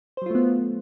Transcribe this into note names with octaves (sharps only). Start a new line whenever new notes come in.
F#3 A3 B3 F4 C5